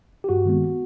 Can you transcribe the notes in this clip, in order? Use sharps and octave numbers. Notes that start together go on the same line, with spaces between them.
G4
G2 F#4
D#3 G#3 B3